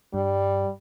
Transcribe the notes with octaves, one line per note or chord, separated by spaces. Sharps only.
G2 G3